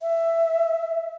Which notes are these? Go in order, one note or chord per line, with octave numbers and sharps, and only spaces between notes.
E5